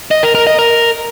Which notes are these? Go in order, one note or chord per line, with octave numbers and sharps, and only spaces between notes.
D#5
A#4
A#4
D#5
A#4